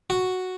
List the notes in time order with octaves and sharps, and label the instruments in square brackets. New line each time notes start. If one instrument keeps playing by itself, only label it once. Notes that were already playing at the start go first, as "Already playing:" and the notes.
[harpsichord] F#4